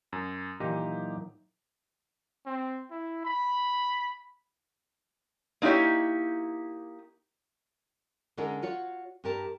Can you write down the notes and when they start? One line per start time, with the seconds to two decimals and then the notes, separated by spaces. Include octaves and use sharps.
0.13 F#2
0.60 A#2 D#3 E3 F#3 D#4 G4 D#5
2.46 C4
2.91 E4
3.25 B5
5.62 A#3 D#4 E4 G4 C#5
8.37 D3 G#3 C#4 D#4 G#4 A#4
8.62 F4 F#4 C#5
9.24 G2 G4 A#4 A5